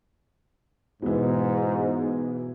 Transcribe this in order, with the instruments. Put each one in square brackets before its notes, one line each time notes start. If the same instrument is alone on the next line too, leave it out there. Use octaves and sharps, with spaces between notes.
[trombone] G#2 [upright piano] B2 E3